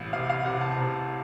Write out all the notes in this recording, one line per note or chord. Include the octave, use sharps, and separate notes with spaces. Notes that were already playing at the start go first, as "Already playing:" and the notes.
Already playing: A1 A2
C3 F5
F5
C3 F#5
A5
A5
C3 A#5